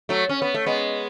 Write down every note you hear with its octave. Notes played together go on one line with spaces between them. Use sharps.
F#3 A3
C#4
B3
A3
G#3 B3